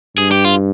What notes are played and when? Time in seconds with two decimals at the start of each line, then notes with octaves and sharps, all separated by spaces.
0.17 G2 G#4
0.31 G4
0.45 F4